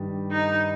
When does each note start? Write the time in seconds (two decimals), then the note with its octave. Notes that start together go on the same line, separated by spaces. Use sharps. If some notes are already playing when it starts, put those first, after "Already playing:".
Already playing: G2 D#3 G3
0.32 D#4